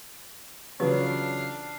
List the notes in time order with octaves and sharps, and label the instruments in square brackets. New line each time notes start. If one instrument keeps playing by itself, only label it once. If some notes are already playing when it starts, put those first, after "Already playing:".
[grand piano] C#3 F#3 F4 [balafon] E3 B4 [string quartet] D4 F5